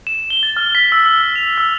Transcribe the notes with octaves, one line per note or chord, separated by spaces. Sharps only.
E7
G7
A6
F6
B6
E6
E6
F7
E6